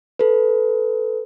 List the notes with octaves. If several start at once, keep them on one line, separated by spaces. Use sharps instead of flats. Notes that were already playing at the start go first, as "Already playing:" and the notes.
A4 B4